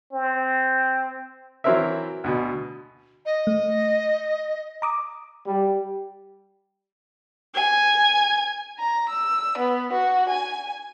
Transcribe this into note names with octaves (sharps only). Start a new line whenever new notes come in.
C4
E3 F#3 C4 E4 A#4 E5
D2 B2
D#5
A3
A#5 D6 D#6
G3
G#5
A#5
E6
B3
F#4
G#5